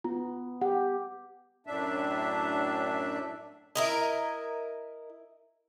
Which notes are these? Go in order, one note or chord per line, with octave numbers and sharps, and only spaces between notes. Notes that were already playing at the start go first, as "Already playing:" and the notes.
B3 F4
G4 F#5
F#2 A2 D4 E5
E4 A#4 D#5